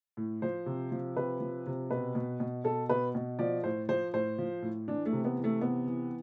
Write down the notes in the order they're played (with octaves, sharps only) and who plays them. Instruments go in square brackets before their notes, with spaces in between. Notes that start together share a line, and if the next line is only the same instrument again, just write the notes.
[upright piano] A2
F3 C5
C3
F3
C3 B4
F3
C3
B2 B4
B2
B2
B2 A4
B2 B4
B2
F3 D5
A2 C5
F3 C5
A2 C5
F3
A2
E3 D4
A3
C3
B3
E3
A3
C3 B3
E3